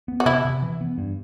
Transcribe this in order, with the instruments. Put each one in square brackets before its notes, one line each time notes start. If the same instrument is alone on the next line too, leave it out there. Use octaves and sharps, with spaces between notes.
[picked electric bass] B3
[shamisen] F#4
[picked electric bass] C3 [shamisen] E4
[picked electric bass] C3
E3
B3
G2